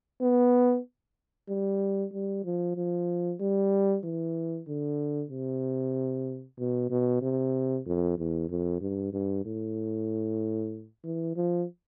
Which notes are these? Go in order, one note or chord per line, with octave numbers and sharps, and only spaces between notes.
B3
G3
G3
F3
F3
G3
E3
D3
C3
B2
B2
C3
F2
E2
F2
G2
G2
A2
E3
F3